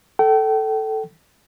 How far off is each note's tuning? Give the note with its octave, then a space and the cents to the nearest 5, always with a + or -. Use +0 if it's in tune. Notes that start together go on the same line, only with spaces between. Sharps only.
A4 +0 G5 -35